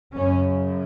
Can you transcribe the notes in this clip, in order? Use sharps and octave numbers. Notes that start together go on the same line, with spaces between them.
F#2 C#3 C#4